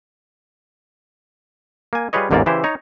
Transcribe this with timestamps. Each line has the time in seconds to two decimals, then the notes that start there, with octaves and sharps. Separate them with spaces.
1.93 A#3 G#5
2.13 G3 F4 G#4 B4 C#5 D#5
2.31 A1 E2 G#2 A#3 A#4 D5
2.46 C#3 E3 E4 G4 C5
2.64 D#4 C#5 A#5